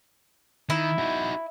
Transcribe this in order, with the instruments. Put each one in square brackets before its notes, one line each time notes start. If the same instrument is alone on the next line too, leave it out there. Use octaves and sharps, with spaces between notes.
[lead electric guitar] D#3 [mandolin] E4
[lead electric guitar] D#4 F#4